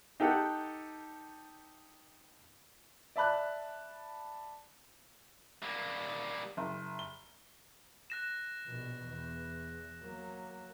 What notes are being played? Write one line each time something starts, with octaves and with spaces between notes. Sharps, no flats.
D#4 G4 A4 F#5
D5 E5 A5 B5 F#6
G3 A#3
F#1
G7
F#6 A#6 E7
A#1 B2
E2
F#3 A#3